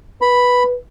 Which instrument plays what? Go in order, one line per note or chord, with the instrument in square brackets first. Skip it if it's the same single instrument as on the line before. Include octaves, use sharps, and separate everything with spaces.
[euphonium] B4 [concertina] B5